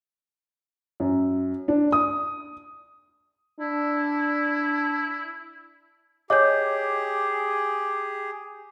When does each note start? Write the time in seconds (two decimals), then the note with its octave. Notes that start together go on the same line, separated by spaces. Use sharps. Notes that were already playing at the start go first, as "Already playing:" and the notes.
1.00 F#2
1.68 D4
1.92 D#6
3.60 D4 E4
6.30 G4 G#4 C#5 D#5 E5 D6 G6